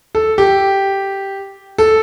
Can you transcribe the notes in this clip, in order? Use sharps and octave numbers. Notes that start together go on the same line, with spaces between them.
A4
G4
A4